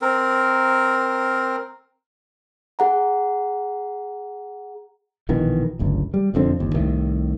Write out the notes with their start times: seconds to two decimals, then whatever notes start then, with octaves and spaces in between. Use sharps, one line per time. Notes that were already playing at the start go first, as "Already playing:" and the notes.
0.02 C4 A#4
2.79 G#4 F#5 A#5
5.29 A#1 B2 D#3 E3
5.79 D1 G1 C#2
6.14 G3
6.34 E1 F2 D3 C4
6.59 G1 D#2
6.74 C2 A2 D#3